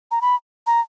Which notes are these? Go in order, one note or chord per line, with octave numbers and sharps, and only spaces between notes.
A#5
B5
A#5